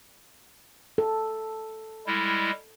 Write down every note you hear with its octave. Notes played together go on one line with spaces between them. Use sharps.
A4
G3 G#3 E4